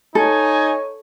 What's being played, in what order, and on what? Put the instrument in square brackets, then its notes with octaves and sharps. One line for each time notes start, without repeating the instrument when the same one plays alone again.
[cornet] D#4 [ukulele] A4 [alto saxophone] C#5 [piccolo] G#5